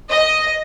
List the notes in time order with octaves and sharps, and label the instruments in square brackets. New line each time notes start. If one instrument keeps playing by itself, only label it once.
[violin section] D#5